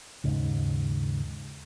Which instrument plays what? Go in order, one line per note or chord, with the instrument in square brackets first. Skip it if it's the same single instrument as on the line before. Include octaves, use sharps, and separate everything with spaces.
[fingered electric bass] D#2 G#2 C#3